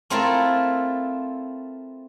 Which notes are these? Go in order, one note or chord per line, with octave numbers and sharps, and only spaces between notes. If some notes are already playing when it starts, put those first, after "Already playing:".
A3 C4 E4 F4 A4 A#4